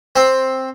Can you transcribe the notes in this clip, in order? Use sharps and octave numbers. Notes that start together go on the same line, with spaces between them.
C4